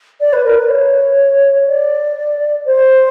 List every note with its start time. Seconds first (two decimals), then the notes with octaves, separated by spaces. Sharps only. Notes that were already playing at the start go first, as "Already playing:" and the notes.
0.20 D5
0.32 B4
0.44 A#4
0.56 B4
0.69 C#5
1.67 D5
2.65 C5